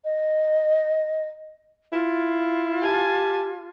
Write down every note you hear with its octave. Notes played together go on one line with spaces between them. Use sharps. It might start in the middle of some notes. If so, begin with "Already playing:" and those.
D#5
E4 F4
G4 G#5 A5